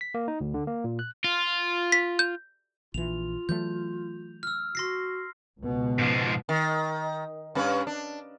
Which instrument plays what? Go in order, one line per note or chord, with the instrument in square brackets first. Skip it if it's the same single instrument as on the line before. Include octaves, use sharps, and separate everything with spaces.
[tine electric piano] B6
A#3
D#4
D2
D3
A#3
A#2
F#6
[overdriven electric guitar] F4
[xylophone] B6
G6
[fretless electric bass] A#1 E3 [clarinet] F4 [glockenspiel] F7
[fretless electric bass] E3 F#3 A3 [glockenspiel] G6
[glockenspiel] E6 F6
[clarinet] F#4 [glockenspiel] C6 A#6 C7
[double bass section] C#2 B2
[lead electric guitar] G#2 F3
[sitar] D#3
G2 C#4 B4
D4